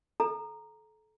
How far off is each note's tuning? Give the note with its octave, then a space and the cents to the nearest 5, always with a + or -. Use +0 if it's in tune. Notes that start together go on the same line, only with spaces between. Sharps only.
A4 -30 A#5 +0